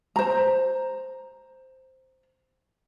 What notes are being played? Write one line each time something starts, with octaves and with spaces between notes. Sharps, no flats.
C5 A#5